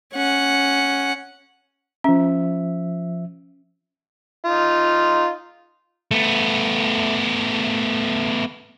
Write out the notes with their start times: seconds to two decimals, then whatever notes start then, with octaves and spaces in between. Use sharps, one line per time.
0.14 C#4 F#5
2.04 F3 C#4 E5
4.45 D#4 F4
6.11 A3 B3